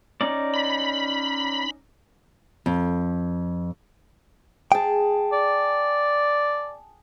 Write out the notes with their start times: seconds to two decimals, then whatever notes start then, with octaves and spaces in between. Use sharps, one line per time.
0.21 C#4 D#4 D5
0.54 B5
2.66 F2
4.72 G#4 G5 A5
5.33 D5